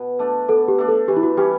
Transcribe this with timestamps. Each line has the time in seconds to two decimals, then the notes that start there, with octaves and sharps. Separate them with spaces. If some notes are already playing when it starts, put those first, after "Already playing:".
Already playing: B2
0.19 A3 D4
0.48 B2 A4
0.68 G4
0.78 A3 D4
0.88 A4
1.08 E3 G4
1.17 E4
1.23 F#4
1.37 G3 C#4 G4